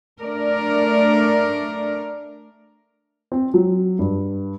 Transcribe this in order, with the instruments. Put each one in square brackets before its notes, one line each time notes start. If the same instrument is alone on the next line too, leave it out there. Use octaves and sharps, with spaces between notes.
[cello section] A3 D4 A#4 D5
[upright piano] C4
F#3
G2